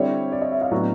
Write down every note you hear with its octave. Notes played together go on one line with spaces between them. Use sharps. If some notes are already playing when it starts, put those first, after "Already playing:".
Already playing: D3 G3 C4 E4 C#5
D5
D#5
E5
F5
A2 F#3 B3 D4